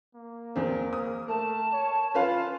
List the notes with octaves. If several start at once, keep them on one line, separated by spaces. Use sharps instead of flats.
A#3
E2 C4 A#4
D#6
A3 A#4 A5
C#5
C#4 F4 B4 F5